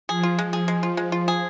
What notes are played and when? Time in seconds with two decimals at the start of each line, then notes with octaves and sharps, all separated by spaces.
0.09 F3 G#4
0.23 F4
0.39 G#3
0.53 G#4
0.68 G#3
0.83 F4
0.97 G#3
1.12 F4
1.28 G#4